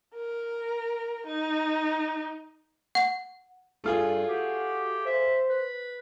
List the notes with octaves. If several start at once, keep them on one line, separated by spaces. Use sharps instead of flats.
A#4
D#4
F#5
G2 A3 F4 G#4
F#4 G4
C5 E5
B4